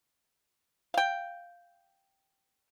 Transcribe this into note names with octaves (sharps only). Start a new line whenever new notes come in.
F5 G5